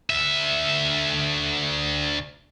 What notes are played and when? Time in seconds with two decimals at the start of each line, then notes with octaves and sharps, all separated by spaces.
0.10 D2 E5